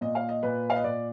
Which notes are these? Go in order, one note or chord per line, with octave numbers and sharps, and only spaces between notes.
A#2 D#5
F5
D#5
A#2 B4
F5
D#5
A#2 D5